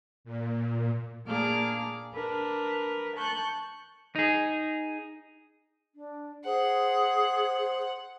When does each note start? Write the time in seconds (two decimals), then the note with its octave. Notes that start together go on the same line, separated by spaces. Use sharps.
0.24 A#2
1.25 A#2 A#3 D4 G#4 D6 F6
2.13 D4 A#4 B4
3.16 A5 C#6 F#6 G6
4.16 D#4 G#4
5.95 D4
6.45 G#4 C5 F#5